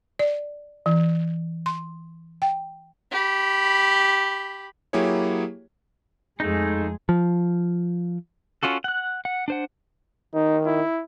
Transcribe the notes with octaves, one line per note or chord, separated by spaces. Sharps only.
D5
E3
C6
G5
G4 B5
F#3 A#3 E4 G4 G#4 C#5
F2 G#3 A3 D#4 G#4
F3
C#4 F4 F#4 A4
F#5 F#6
F#5
D4 C5 F#5
D#3 D#4
E4